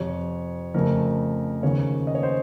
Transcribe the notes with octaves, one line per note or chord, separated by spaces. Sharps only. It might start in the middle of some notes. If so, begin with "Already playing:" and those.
Already playing: F2 C3 F3 C#5
F2 C#3 F3 A3 A#4
D#2 C#3 F3 A#3 C#4 C#5
D#5
C#5
C5